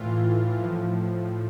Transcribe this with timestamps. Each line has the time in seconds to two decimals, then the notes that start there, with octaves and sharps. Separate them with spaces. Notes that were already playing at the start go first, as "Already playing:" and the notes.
Already playing: A2 E3 F4
0.58 A2 F3